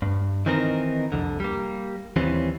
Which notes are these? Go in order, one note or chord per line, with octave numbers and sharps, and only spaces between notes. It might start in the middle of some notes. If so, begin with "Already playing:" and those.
G2
D#3 E3 C4 D#4 G#4 A#4
C2 F2 D3
G3 A#3
D#2 E3 G3 C4 C#4